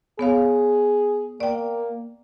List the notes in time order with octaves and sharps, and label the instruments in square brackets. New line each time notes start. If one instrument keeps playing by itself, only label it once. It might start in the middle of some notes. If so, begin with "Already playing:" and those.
[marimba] B3 C#5 F5 [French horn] G#4
[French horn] A#3 [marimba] D5 G5